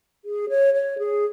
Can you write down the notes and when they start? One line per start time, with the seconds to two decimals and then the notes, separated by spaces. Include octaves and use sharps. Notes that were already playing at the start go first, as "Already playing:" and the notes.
0.25 G#4
0.49 C#5
0.74 C#5
0.98 G#4